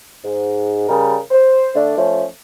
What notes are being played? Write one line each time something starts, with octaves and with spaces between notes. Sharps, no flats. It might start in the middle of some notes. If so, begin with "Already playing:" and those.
G#2
C#3 G3 A#4
C5
D3 A3 D4
F3 A3 C#4